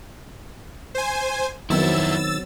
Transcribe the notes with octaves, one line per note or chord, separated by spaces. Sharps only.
C5 G#5
F2 D#3 F#3 B3 C4 E4 E6 A6